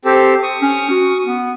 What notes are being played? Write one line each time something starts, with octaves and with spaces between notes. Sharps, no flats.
C4 G4 A4
C#6 D#6
C#4
F#4
B3